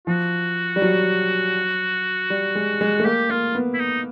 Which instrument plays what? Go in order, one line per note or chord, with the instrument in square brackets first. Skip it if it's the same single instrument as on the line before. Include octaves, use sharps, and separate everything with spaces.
[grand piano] F3 [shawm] F#4
[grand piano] G3
F#3
G3
G#3
G#3
A3
[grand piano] A#3 [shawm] G4
[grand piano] A#3 [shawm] F4
[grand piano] B3
[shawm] E4
D#4